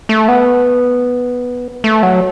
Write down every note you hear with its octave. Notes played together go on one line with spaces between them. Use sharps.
A3
B3
A3
F#3